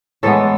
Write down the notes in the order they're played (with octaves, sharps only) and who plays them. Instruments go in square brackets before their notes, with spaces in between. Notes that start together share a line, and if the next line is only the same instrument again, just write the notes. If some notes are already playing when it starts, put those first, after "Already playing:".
[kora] A2 E3 G#3 B3 A4